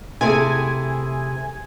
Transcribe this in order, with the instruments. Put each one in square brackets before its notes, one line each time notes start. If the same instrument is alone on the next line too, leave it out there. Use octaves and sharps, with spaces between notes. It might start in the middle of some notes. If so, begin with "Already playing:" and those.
[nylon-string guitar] C3 A3 C4 [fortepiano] E4 G#4 [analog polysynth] G#5